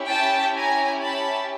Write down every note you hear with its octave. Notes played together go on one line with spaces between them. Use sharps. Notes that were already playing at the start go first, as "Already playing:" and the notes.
Already playing: C#4 E4 G4
G5 A5
G#5 A#5
A5 B5